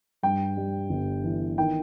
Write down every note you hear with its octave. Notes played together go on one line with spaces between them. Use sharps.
G2 G5
G3
G1
E3
D#3 G5